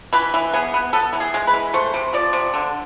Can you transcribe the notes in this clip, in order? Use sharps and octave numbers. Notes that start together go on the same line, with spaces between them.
E3 B4
E3
B3 G#4
B3
B3 A4
E3
G#4
G#3
B4
E3
A3 C5
C3
F3 D5
C3
D3